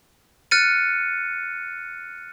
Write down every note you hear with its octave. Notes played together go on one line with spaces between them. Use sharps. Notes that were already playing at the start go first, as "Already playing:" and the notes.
F6 F#6 A6 C#7 D#7